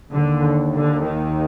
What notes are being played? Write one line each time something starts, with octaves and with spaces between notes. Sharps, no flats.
D#2 D3
D3
D#3